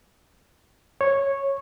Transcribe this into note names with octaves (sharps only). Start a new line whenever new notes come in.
C#5